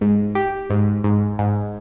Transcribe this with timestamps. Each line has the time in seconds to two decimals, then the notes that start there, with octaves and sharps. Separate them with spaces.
0.01 G#2
0.35 G4
0.70 G#2
1.04 G#2
1.39 G#2